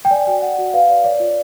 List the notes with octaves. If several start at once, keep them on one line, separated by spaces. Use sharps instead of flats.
G5
D5 G#5
F#4 G5
D5 F#5
F#4
B4 F5
D5
C#5 D5
F4